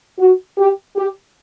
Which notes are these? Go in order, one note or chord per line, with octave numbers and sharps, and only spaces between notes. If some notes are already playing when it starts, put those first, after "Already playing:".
F#4
G4
G4